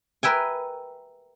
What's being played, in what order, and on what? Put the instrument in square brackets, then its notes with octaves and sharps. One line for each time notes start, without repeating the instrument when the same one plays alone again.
[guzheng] A#4 B4 E5 G5 G#5